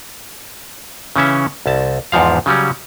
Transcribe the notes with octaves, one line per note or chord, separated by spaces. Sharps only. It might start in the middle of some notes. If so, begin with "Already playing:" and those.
C#3 E3 C#4 E5
C2 A5
E2 G#2 F3 F5
C#3 F#3 G3 C#4